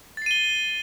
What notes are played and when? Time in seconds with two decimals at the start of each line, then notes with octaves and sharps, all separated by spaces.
0.17 A6
0.22 C7
0.26 D#7
0.31 G7